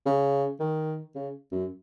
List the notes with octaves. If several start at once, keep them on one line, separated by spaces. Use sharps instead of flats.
C#3
D#3
C#3
F#2